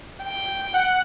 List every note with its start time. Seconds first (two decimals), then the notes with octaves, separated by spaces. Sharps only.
0.23 G5
0.74 F#5 F#6